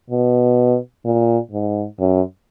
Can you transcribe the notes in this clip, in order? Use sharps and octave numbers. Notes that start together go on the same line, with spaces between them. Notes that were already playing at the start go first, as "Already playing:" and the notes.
B2
A#2
G#2
F#2